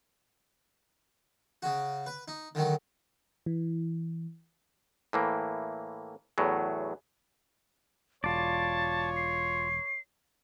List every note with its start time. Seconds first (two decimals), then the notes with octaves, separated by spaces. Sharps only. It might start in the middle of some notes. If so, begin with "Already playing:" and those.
1.62 C#3 F#4
2.06 B4
2.28 D#4
2.55 D3 D#3 F#3
3.46 E3
5.13 A2 E3 A#3
6.38 E2 A2 F#3
8.24 E1 F4 C#5 D5 A5
9.16 C7